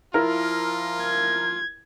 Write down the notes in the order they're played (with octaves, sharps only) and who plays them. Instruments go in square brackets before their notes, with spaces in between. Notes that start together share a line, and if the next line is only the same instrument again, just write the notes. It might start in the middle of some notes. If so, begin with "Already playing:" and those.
[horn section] F3 F4 [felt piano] E4 A#4
[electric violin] G#6